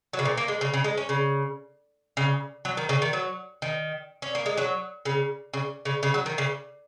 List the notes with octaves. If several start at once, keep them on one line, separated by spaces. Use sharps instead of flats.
F#3
C#3
A#2
A#3
G#3
C#3
C#3
G#3
C#4
C#3
C#3
F#3
D#3
C#3
D#3
F#3
D#3
C#4
A#3
G#3
F#3
C#3
C#3
C#3
C#3
F#3
D#3
C#3